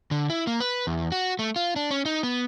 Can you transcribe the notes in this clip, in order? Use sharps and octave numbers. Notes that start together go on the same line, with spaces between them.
D3
E4
A#3
B4
E2
F#4
A3
F4
D4
C#4
D#4
B3